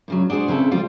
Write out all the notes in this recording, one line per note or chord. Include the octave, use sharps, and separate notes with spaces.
G2 C#3 F#3
D4 F#4 G#4 A#4 C5
C#3 C4 E4 A4
D2 F3 G3 F4